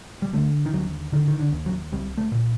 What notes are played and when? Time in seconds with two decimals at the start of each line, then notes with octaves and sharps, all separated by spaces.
0.22 G3
0.33 D3 A3
0.66 D#3
0.73 D#2 F#3
1.12 D3 D#3
1.28 D#3
1.40 D3
1.52 D#2
1.66 F#3
1.92 C2 G3
2.18 A3
2.32 A#2